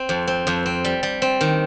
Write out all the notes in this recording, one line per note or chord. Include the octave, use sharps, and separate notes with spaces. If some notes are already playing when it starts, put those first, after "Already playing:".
Already playing: C4
F2
C4
F2
C4
G3
G3
C4
D#3